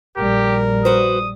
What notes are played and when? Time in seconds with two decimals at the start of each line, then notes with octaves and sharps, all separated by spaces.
0.17 A#1 G3 G4 A#4
0.85 F#4 B4 C5 D#6